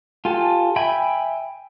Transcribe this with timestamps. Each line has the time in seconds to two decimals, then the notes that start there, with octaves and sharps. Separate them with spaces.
0.25 F4 G4 A4 G#5
0.76 E5 G5 G#5 B5